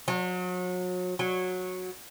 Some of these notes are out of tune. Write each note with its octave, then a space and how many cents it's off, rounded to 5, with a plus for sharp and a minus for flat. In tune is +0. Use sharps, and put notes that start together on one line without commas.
F#3 -35
F#3 -15